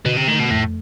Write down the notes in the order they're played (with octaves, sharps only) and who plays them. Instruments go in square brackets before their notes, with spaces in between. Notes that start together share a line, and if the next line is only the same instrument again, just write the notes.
[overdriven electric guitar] B2 [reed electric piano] D3
[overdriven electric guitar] C3
[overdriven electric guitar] D#3 [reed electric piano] A3
[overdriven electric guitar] B2
[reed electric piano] F2 [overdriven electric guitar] A2